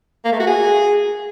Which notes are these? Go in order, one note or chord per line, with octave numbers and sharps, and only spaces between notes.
A#3
A3
F#4
G#4